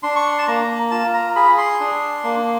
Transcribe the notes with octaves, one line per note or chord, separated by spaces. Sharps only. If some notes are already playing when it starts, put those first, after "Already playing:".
D4 C6
C#6
C6
A5
A#3 A#5
F4 A5
A#5
G#4 B5
C6
D4
A#3